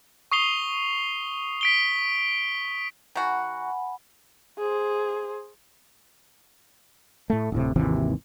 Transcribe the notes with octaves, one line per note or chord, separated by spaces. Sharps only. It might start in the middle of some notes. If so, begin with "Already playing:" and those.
C#6 D#6 C7 F7 G7
B6 D7 G7
D#3 F#4 F#5 G#5 B5
G#4 C5
A2 A3
D1 A2 C3
G#1 D#2 C3 E3